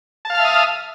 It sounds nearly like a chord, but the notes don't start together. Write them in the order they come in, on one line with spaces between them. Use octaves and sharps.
A5 F5 F6 E5 D#6